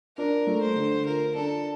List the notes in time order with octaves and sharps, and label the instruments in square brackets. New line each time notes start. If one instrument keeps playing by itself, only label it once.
[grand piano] D4 [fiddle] A#4
[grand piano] A3
[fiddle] C5
[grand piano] D3
[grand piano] F4 [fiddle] A#4
[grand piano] D4 [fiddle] A4